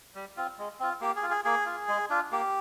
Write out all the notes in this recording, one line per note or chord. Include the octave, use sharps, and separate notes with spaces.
G3
C4 F4
G#3
C4 F4
A#3 G4
G#4
F4
G#4
A#3 G#4
F4
G#3
D4 F4
A#3 G4